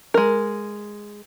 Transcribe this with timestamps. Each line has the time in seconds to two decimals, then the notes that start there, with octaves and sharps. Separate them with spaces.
0.14 G#3 A#4